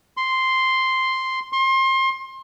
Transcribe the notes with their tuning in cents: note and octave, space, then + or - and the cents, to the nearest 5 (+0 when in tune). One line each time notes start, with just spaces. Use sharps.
C6 +0
C6 +30